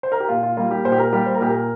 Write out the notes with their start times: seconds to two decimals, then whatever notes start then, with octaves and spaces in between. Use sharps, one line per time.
0.03 C5
0.12 A#4
0.20 G4
0.29 A#2 F4
0.43 F4
0.57 G3 A#3 F4
0.71 G4
0.85 A#2 C5
0.92 G4
0.98 A#4
1.12 G3 A#3 G4
1.26 C5
1.34 A#4
1.40 A#2 G4
1.50 A#4